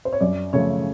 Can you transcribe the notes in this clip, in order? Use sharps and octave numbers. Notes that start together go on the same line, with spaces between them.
C5
C#5
F#2 D5
C#3 F3 A3 C#5